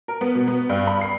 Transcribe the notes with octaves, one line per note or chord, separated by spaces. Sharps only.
A#4
B3
B2
B3
G2
B5
C7